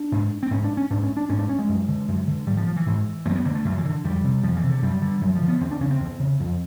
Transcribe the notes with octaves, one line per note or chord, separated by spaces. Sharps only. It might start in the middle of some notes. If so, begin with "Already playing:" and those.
Already playing: D4
G#2
C4
G#2 C#4
D4
C#4
G#2 D4
C#4
D4
G#2 C#4
D4
C#4
G#3
F#2
D3
F#2
D3
G#2 G3
F3
F3
E3
G#2
F#2 A#3
C4
B3
D3 A#3
A3
F#2
E3
D3
F2 G3
C3
F2 F3
E3
C3
D3
F#2 G3
D3
F#2 F#3
F3
D3
B3
E2 C4
D4
C#3 C#4
C4
E2
C#3
F2